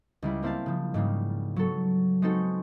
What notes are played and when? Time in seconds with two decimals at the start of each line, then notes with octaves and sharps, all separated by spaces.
0.22 C#2 G3 E4
0.42 A#3 C4 E4 F5 A5
0.66 C#3 F3
0.94 G#2 C#3 G3 A#3
1.56 F#3 B3 A4
2.22 G#3 B3 C4 D#4 F#4 A4